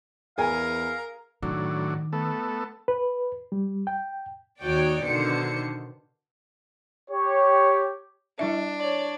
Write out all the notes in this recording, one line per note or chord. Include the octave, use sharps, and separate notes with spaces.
E2 G#4 A#4 F5 G#5 A#5
A2 D#3 F#3 D4
A3 B3 A4
B4
G3
G5
D#2 D#4 F#4 C#5 D5 G5
B2 D3 D#3 C5 C#7
G4 C#5
G3 D4 E4 E5
C#5 D5